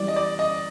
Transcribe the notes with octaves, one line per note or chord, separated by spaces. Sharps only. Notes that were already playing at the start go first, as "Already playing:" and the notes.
Already playing: E3 G3 D5
D#5
D5
D#5